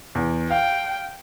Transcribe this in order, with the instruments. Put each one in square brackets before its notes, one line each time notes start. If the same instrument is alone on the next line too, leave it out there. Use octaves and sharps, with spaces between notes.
[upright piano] E2
[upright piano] F5 [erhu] G5